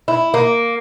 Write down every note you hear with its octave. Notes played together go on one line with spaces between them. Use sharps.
E4
A#3